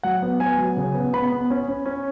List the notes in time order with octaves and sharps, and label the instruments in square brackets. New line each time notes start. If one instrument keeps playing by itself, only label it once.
[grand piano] F#3 F#5
B3
B3 G#5
F#3
C#3
B3
B3 B5
B3
C#4
C#4
C#4